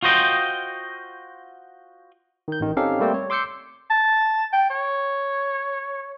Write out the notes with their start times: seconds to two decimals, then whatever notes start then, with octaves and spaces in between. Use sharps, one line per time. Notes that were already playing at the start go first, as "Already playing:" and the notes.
0.03 F4 F#4 C5 D#5 G5
2.48 D#3 G6
2.60 A1 D#3
2.76 C4 C#4 D#4 G4 A4 F5
3.00 G3 A3 A#3 C4 C5 D5
3.14 C#5
3.30 C6 D6 E6 G6 C7 C#7
3.90 A5
4.53 G5
4.70 C#5